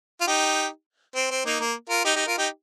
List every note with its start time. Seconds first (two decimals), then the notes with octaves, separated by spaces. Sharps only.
0.21 F4
0.27 D#4 G4
1.15 C4
1.31 C4
1.45 A#3 D#4
1.60 A#3
1.89 F4 A#4
2.04 D#4 G4
2.15 D#4 G4
2.26 F4 A#4
2.38 D#4 G4